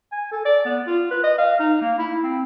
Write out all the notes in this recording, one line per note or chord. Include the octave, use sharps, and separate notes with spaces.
G#5
A4
D5
B3
F4
B4
D#5
F5
D#4
A#3
E4
C4